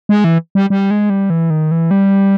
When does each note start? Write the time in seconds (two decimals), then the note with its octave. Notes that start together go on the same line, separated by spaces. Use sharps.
0.09 G#3
0.24 E3
0.55 G3
0.70 G3
0.91 G#3
1.10 G3
1.30 E3
1.50 D#3
1.71 E3
1.91 G3